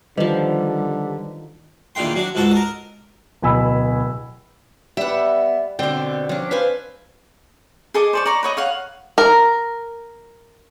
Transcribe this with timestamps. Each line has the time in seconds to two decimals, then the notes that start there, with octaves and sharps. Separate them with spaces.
0.18 D3 D#3 F3 G3 B4 C5 D#5
1.95 E2 A#2 D3 D#3 G5 C6
2.15 F#3 D4
2.35 C#2 G#2 F#4 A4 A5
2.51 A#4 D#5
3.42 D1 B2 G#5 B5 E6
4.97 G3 B3 E5 F#5
5.79 B2 D3 C4 D5 G5
6.29 F3 C#4 D4
6.51 C4 B4 C5 F5 G#5
7.94 G#4 A4 D#5 D6
8.13 C5 D5 C#6
8.26 D5 A#5 C#6
8.43 B4 C#5 D#5
8.57 C#5 F5 F#5
9.18 A#4